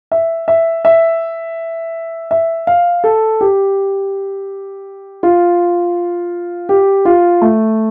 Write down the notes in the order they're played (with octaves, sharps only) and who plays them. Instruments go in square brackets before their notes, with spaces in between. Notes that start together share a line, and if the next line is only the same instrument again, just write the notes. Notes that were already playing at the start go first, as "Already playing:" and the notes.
[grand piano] E5
E5
E5
E5
F5
A4
G4
F4
G4
F4
A3